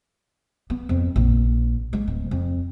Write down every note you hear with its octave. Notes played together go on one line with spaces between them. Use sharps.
B3
F2
A#1
G#3
D1
F2